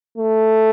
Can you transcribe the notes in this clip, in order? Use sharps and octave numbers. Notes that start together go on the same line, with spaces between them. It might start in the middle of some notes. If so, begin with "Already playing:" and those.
A3